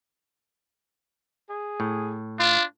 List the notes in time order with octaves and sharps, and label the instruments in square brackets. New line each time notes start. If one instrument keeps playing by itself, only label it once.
[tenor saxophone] G#4
[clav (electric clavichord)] A2
[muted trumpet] D4 [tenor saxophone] F4